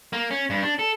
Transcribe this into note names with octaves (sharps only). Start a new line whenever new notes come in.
A#3
C#4
G2
D4
A4